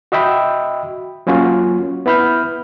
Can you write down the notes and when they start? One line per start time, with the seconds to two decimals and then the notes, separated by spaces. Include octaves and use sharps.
0.12 F#4 D#5 E5 G5 B5
1.27 F#3 A#3 C#4 F4 F#4
2.06 B3 E4 B5 F6 G6